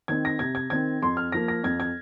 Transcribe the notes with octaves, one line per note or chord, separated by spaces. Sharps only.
D#3 C4 G#6
A#6
C3 G#6
G#6
D#3 C4 G#6
F2 C6
F6
F3 A#3 A#6
A#6
F2 G#6
G#6